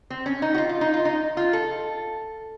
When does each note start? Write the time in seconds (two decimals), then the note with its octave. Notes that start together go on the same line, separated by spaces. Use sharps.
0.10 C4
0.26 C#4
0.42 D#4
0.54 F#4
0.58 F4
0.69 F4
0.81 D#4
0.94 F4
1.05 D#4
1.37 F4
1.53 A4